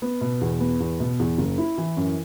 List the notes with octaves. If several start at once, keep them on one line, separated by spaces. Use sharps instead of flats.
B3
B2
E2
B3
E2
B2
E2
F#1
E4
E3
F#2